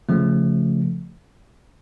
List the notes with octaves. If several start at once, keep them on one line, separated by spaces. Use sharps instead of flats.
C#3 F3 A3